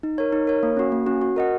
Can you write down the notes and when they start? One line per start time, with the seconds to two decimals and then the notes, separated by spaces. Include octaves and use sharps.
0.03 D#4
0.18 A#4 C#5
0.33 D#4
0.47 A#4 C#5
0.63 A#3
0.77 C#4 F#4
0.92 A#3
1.06 C#4 F#4
1.21 F#4
1.36 A#4 D#5 F#5